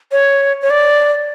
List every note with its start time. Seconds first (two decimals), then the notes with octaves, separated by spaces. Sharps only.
0.12 C#5
0.62 C#5
0.70 D5